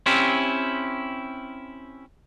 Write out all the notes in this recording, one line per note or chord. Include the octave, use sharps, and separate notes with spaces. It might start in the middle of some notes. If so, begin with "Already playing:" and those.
C4 C#4 E4 G4